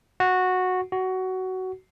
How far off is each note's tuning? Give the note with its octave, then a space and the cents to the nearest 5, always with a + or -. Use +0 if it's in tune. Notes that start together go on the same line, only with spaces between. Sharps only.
F#4 -10
F#4 +15